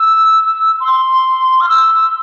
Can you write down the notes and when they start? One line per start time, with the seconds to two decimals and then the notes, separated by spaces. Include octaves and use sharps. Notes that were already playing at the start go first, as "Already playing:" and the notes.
Already playing: E6
0.80 C6
1.60 F6
1.69 E6